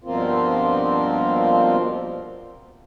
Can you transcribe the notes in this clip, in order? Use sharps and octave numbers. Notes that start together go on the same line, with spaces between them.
G2 B2 F3 A#3 C4 F4